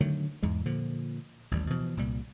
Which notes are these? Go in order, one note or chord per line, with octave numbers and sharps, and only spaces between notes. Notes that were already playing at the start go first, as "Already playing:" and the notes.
D3 D#3 F#3 A3
E2 G#2 G#3
A#2 D3 F3
A1 D#2 G3
B2 E3 F3
C2 A#2 G3